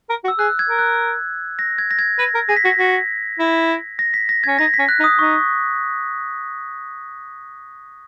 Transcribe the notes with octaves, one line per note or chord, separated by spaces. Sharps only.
A#4
F#4
E6
G#4 F#6
G#6
A#4
F#6
A#6
G#6
A#6
G#6
B4 A#6
A#4
G#4 A#6
B6
F#4 A#6
F#4 B6
E4
A#6
B6
A#6
G#6
C#4
D#4 A#6
B6
C#4
F#6
D#4
D#6
D#4 C#6